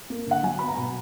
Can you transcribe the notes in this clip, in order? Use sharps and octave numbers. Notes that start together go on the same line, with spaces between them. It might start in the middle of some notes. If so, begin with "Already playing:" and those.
A#3
D3 F#5
F#3 G#5
B3 B5
A#5
B2